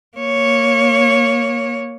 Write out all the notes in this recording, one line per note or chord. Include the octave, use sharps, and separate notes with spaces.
A#3 C#5